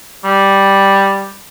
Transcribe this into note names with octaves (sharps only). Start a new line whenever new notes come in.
G3